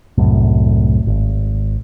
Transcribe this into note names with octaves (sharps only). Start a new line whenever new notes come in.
C2 F#2 A2
G#1